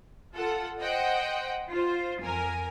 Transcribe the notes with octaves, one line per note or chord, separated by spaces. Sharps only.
F4 A4 F#5
C5 D#5 F#5 G5
F4 C5
F2 A#4 G#5